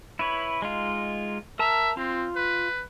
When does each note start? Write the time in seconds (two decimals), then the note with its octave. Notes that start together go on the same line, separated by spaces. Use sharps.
0.19 E4 B4 C#5
0.62 G#3 D#4 F4
1.59 A#4 E5 A5 A#5
1.97 C4 F4
2.36 B4